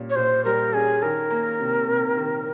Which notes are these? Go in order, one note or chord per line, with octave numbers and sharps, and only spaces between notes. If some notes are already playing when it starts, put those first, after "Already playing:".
Already playing: A#2 G3 C#4
C#5
A#2 C5
G3 A#4
C#4 G#4
D#3 A#4
A#3
C3
C3
D#3